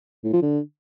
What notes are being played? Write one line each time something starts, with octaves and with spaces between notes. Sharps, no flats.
A2
F3
D3